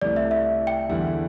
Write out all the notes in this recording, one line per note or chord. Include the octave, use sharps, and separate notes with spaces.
C2 C3 A3 E4 D5
E5
E5
G5
E2 D3 G3 E4